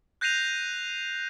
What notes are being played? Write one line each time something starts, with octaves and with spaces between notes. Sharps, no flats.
F#6 G6 A#6 C7 D#7 F7